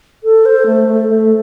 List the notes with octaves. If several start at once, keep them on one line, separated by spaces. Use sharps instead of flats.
A4
C5
A3
A3
A3